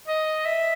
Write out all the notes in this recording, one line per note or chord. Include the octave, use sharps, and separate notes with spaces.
D#5
E5